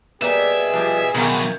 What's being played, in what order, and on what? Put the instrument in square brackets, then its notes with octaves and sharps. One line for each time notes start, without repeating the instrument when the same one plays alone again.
[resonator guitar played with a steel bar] G3 A#3 D5 [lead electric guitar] F#4 B4 [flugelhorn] G#4 [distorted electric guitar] E5
[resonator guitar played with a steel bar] F3 G3
[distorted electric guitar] B2 F#3 [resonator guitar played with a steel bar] D#3 F5 [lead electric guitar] A#4 E5